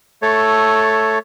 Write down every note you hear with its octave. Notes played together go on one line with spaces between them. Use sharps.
A3 A4 C#5